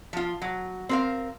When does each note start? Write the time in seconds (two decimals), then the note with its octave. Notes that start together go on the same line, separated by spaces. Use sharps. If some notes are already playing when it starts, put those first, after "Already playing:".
0.13 F3 F4
0.42 F#3
0.89 C4 A#4 F5